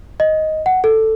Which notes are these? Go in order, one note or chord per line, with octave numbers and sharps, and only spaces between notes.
D#5
F#5
A4